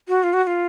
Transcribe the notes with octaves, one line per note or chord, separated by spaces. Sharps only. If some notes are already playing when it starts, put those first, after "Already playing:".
F#4
F4
F#4
F#4
F4